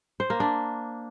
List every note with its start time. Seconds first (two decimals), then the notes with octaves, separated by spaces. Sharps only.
0.20 C5
0.30 A#3
0.40 D4